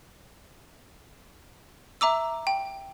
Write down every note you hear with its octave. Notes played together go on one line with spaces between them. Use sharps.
E5 A#5 D6 E6
G5